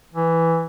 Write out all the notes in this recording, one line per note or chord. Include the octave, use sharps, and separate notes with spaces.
E3